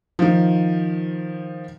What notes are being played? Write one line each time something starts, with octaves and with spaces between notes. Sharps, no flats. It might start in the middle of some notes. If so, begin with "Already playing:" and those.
D#3 F3